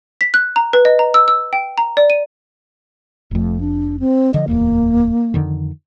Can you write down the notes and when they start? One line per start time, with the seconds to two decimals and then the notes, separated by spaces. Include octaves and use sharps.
0.21 B6
0.34 F#6
0.56 A#5
0.73 B4
0.85 D#5
0.99 A#5
1.14 E6
1.28 E6
1.53 G5
1.78 A#5
1.97 D5
2.10 D#7
3.31 F1 F2 A3
3.60 D4
4.00 C4
4.34 D3 F3 D#5
4.48 D1 G1 E2 A#3
5.34 F2 D3 D#3